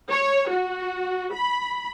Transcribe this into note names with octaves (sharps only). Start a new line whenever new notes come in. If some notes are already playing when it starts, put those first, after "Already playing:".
C#5
F#4
B5